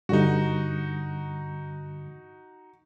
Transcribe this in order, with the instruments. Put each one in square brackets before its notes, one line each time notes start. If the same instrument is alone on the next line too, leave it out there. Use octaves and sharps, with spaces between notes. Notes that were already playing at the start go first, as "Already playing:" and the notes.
[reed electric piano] G2 D3 [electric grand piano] D#4 F#4